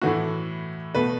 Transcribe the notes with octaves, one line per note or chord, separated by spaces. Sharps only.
A2 E3 A3 F#4
B2 A3 B4